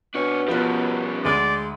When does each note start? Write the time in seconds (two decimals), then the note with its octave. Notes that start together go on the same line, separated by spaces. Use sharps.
0.15 B2 D4 C#5
0.48 F3 G3 B3 C#4 B4
1.25 D2 G#3 D5